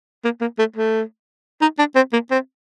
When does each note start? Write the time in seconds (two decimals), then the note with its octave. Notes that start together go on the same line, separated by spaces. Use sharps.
0.24 A#3
0.41 A#3
0.59 A3
0.76 A3
1.62 D#4
1.79 D4
1.95 C4
2.13 A#3
2.31 C4